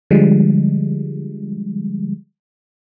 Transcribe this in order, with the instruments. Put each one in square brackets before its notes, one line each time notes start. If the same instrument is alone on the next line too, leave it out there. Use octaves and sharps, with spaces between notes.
[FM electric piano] D3 F3 G3 G#3